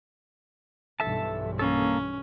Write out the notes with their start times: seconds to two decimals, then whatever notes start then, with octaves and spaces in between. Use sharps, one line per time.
1.00 B1 G2 E3 A4 E5 A5
1.59 A#3 C#4 A4